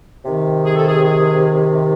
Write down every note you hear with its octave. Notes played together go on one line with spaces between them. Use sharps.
C3 D#3
G#4
A4
G#4
G#4